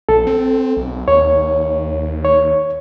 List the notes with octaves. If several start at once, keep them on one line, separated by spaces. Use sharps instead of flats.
A#1 A4
C4
B1
D#2 C#5
C#5